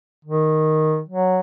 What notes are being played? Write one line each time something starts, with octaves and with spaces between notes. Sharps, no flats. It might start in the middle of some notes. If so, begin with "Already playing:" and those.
D#3
F#3